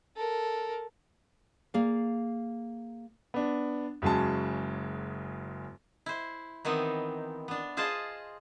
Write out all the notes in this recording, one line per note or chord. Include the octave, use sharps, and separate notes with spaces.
A4 A#4
A#3 G#4 D5 F5
B3 D4
F#1 C#3 F#3 G#3 A5
E4 C5
D#3 E3 B3 C4 D#4
B3 D4
F4 G#4 C5 D#5 A5